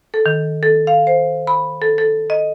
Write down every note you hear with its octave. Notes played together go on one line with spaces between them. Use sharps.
A4
D#3
A4
F5
C5
B5
A4
A4
D#5